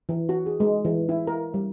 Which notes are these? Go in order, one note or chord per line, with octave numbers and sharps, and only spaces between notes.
E3
F#4
G#4
G#3
E3
E4
A#4
G3